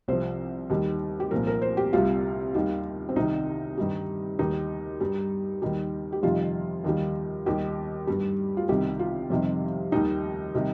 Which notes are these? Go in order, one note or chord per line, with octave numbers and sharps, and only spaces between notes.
C2 C3 F3 C5
D#2 D#3 G3
G4
C2 A#2 F3 A#4
A#4
C5
G4
C2 C3 G3 F4
D#2 D#3 G3
C4
C2 C3 D#3 D#4
G2 D#3 G3
D#2 D#3 G3 D#4
G2 G3
D#2 D#3 G3
G4
F2 C3 D#3 G3 F4
D#2 D#3 G3
D#2 D#3 G3 G4
G2 G3
F4
C2 C3 D#3 G3 G4
F4
F2 C3 D#3 G3
D#2 D#3 G3 D#4
C3 D#3 G3